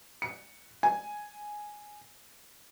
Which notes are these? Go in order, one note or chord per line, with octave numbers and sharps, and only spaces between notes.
C#7
G#5